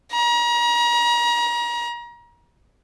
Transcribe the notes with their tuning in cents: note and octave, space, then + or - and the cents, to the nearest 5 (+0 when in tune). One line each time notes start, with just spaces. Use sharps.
A#5 +35